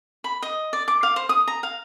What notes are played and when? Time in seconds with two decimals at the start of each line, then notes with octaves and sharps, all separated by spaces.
0.24 B5
0.42 D#5
0.73 D5
0.88 D6
1.03 F5
1.16 C5
1.29 D#6
1.47 A#5
1.63 F5